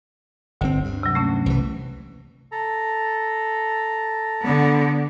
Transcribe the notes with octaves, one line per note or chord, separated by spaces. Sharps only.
G1 D2 C4
G2
C3 F#3
A3 A#3 C#4
C2 E3
A4 A#5
D3 B3